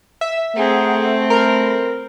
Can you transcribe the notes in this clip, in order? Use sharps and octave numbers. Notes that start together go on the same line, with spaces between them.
E5
A3 C4 G#4 F#5 A#5
A#4 B5